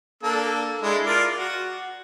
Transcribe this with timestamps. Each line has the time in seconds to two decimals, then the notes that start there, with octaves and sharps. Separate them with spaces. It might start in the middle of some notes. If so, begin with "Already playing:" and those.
0.23 A#3 D4 A4
0.82 G#3 D4 E4
1.06 F4 A#4 D5
1.37 F#4